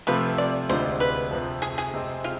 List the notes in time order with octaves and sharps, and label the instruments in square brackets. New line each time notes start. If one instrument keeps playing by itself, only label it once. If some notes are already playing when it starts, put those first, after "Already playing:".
[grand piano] C3 F3 A3 C4 F4 [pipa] B4
[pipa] D5
[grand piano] D2 C3 G#3 D4 F4 [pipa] C5
[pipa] B4
[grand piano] F2 C3 F3
[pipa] G#4
G#4
[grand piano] C3 G#3 C4
[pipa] F4